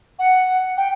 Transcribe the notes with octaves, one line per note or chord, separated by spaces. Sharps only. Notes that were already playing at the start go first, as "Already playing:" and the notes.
F#5
G5